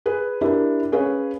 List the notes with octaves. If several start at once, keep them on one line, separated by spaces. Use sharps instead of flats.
G#4 B4
D4 E4 G4 A#4
C#4 G#4 B4 C#5 F5